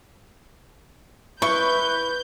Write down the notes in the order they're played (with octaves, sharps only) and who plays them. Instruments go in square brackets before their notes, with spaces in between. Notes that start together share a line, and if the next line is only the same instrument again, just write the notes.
[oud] E4 [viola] B4 [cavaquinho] C#6 [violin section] G6